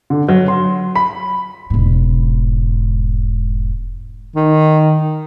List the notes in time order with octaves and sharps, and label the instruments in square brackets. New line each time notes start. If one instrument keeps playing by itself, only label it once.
[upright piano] D3
F#3
C6
B5
[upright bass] E1 G#2
[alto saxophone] D#3